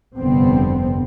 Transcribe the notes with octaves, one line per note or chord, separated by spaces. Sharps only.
F1 G2 D3 B3 C4